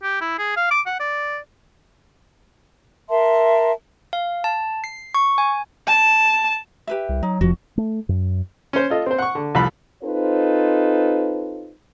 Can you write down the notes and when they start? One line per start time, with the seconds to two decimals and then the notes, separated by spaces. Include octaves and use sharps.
0.03 G4
0.21 E4
0.39 G#4
0.56 F5
0.71 D6
0.86 F#5
1.00 D5
3.10 A#4 E5 A5 C6
4.13 F5
4.44 A5
4.84 C7
5.15 C#6
5.38 G#5
5.87 A5
6.87 G4 B4 E5
7.09 C2
7.23 F#3 D#4
7.41 F1 F2 F3 F#4
7.78 A3
8.09 F#2
8.73 C#4 C5
8.90 F4 A4 D#5
9.06 C4 C5
9.18 F#5 C#6
9.35 D3
9.55 C2 F2 F4 B5
10.02 C4 D#4 F4 A4 B4 C5